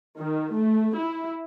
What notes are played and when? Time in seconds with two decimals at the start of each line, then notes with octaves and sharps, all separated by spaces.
0.18 D#3
0.53 A3
0.97 E4